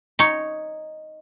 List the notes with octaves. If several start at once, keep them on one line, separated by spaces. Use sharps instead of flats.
D#4 C#5